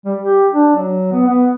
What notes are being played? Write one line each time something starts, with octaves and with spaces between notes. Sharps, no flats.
G3
G4
D4
F#3
B3
B3